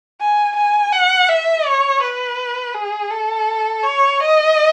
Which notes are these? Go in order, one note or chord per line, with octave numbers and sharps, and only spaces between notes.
G#5
G#5
F#5
E5
C#5
B4
G#4
A4
C#5
D#5